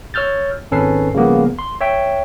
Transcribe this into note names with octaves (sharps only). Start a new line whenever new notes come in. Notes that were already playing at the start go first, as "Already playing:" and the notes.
C#5 E6 F6 G6 A6
G#1 C#4 A4 B4 C7
C#3 F3 G3 A#3 B3
C6
C#5 E5 G5